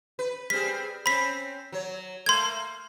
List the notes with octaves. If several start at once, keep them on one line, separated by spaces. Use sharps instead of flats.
B4
G3 C4 G#4 B6
C4 C#4 B5 B6
F#3 C#5
A3 A#3 C6 G#6